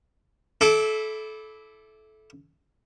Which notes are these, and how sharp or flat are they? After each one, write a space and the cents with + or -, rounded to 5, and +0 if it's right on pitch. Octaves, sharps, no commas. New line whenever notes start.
E4 +0 A4 -25 D6 +0